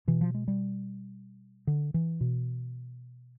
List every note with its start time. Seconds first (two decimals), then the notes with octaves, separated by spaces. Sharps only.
0.08 B2 E3
0.21 F3
0.34 G#3
0.48 G3
1.67 D3
1.94 E3
2.21 B2